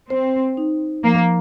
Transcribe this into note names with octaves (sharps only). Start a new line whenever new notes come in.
C4 C5
D#4
F3 A#3